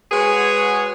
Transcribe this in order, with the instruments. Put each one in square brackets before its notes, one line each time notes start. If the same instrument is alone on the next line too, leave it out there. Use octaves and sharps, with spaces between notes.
[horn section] G#3 F#4 G#4 B4 C#5 F#5